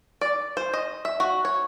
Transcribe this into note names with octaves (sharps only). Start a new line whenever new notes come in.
D5
C5
D#5
E5
F#4
C#5